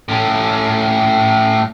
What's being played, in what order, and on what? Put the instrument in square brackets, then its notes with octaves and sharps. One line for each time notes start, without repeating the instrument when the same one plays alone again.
[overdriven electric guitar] A2 C#4